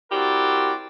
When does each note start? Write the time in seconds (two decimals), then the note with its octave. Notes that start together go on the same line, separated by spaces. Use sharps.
0.12 C4 E4 F#4 G4 A#4 D5